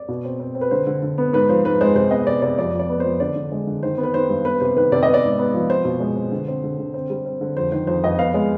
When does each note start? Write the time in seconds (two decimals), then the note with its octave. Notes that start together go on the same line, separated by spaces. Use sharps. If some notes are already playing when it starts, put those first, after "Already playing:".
Already playing: D5
0.08 B2
0.25 C4
0.40 C4
0.55 C4
0.61 B4
0.71 D3 C5
0.87 D3
1.03 D3
1.18 B3
1.33 G#2 B4
1.49 F3 C5
1.65 G#2 B4
1.81 G#3 C5
1.95 C3 C5
2.11 B3 D#5
2.27 C3 D5
2.42 C3 D5
2.58 F2 D5
2.74 F2
2.79 D5
2.89 B3
3.00 F2 C5
3.20 D3 D5
3.36 D3
3.52 G#3
3.67 D3
3.83 D#3 C5
3.98 B3
4.03 B4
4.14 D#3 C5
4.30 G2
4.45 B3 B4
4.60 C3 C5
4.76 D#3 B4
4.92 C3 D5
5.03 B3 D#5
5.14 D5
5.23 G#2
5.39 B3
5.54 F3
5.69 C4 C5
5.85 B2
6.00 G#3
6.16 C4
6.32 D3
6.48 C4
6.64 D3
6.79 D3
6.94 C4
7.10 G3
7.26 C4
7.41 D3
7.57 F2 C5
7.72 D#3 C5
7.87 F2 C5
8.03 F2 D#5
8.18 B3 F5
8.34 G#3